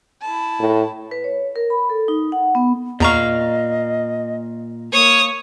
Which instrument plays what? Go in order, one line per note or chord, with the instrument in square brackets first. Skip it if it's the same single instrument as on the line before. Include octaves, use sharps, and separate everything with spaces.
[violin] E4 A5
[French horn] A2
[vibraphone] B4
C#5
A#4
B5
A4
D#4
F#5
B3
[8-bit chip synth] E2 A#5 C#6 [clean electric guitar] A#2 F5 [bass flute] D#5
[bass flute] A#3 [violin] C#5 D#6